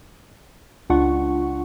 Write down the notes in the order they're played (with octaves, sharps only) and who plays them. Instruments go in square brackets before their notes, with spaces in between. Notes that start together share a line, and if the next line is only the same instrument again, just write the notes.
[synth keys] C#2 D4 F4 F#5 C#6